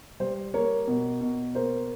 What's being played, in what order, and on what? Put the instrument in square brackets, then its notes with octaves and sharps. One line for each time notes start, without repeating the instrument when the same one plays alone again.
[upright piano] G3 C5
A#3 C#5
B2
B2
A#3 C5